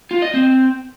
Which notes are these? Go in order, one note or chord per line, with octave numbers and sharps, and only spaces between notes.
F4
D#5
C4